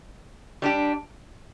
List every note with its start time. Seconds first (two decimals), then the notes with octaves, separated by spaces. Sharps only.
0.62 G3 D4 G4